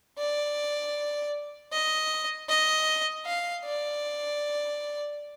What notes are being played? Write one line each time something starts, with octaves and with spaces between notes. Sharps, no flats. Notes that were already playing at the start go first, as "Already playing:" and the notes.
D5
D#5
D#5
F5
D5